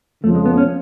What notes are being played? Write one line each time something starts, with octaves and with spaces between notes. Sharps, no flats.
F2 C#3 F3 A3
G#3
B3
C#4